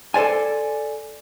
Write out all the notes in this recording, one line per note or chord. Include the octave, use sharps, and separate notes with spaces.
A4 A#4 C5 D5 G#5